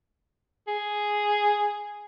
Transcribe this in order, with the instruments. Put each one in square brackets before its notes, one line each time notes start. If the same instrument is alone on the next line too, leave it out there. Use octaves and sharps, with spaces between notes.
[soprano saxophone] G#4